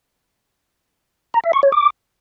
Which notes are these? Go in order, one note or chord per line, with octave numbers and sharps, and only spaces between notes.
A#5
E5
C#6
C#5
D6